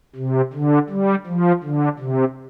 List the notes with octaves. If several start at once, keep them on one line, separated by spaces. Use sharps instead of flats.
C3
D3
G3
F3
D3
C3